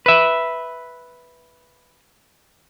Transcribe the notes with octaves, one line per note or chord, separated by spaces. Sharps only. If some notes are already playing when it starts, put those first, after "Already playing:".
B4 E5